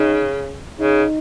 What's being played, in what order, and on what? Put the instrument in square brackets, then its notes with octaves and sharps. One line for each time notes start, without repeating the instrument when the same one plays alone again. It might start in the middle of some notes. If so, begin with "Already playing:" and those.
Already playing: [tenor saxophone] C#3 [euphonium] D#4
[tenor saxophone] C#3 [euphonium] D#4